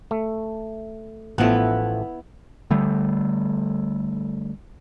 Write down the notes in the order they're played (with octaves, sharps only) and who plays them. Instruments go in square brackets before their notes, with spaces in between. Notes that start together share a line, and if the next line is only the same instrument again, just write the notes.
[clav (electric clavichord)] A3
[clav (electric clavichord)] A1 F3 A3 [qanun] B3 E4
[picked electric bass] D3 G3 A3